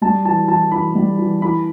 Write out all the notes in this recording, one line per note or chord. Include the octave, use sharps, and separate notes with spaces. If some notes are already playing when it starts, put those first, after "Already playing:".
G3 A5
E3 A5
E3 A5
E3 B5
G3
E3
E3 B5